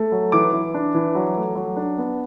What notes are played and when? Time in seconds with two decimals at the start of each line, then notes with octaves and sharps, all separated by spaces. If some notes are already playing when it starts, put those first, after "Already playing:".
Already playing: A3
0.12 F#3
0.32 E3 D6
0.53 E3
0.74 D4
0.94 E3
1.15 F#3
1.36 A3
1.56 F#3
1.76 D4
1.98 B3